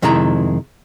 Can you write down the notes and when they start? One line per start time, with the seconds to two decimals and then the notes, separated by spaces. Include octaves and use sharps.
0.02 F2 C3 D#3 G#3 E4 A#5